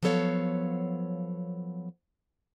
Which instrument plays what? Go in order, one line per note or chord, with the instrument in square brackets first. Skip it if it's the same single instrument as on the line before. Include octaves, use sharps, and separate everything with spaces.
[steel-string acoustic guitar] F3 F#3 B3 A4 C#5 F5